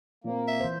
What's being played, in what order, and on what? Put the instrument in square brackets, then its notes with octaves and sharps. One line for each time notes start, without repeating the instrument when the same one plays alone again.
[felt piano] A#2 C4 [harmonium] A#3
[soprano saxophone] E5
[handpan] E3 C5